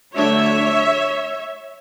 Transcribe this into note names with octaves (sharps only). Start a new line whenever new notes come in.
D3 F#3 A3 D4 C#5 E5